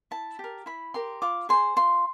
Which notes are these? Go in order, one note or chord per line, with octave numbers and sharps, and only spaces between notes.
E4 A5
G4 A#4
E4 B5
G4 A#4 C6
F4 D6
G#4 C5 C6
F4 C6